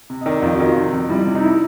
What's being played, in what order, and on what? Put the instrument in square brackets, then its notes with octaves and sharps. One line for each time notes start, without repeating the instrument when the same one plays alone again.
[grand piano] C3
[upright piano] D#5
[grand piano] D#3 [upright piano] D5
[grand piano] F2 [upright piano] F4
[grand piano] D#3 [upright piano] F#4
[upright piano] F4
[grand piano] C3
F2
[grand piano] G3 [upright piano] E4
[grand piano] C3
[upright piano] D#4
E4